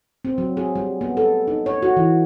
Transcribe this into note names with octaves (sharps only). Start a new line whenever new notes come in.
C4
F#3
G#4
G3
B3
A4
D#4
C#5
F#4
E3